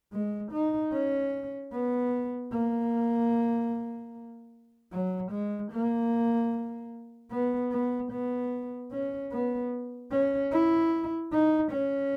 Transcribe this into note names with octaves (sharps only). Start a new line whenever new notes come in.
G#3
D#4
C#4
B3
A#3
F#3
G#3
A#3
B3
B3
B3
C#4
B3
C#4
E4
D#4
C#4